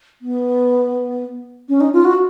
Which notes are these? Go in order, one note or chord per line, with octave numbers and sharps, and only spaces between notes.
B3
C#4
D#4
F4
F#4